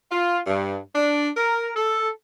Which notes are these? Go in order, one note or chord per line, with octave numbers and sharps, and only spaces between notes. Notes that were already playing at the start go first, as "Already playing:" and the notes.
F4
G2
D4
A#4
A4